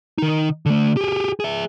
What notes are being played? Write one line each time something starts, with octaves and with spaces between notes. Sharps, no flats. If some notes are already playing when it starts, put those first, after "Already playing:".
D#3 D#4
D3 A3
G4 G#4
G#4 E5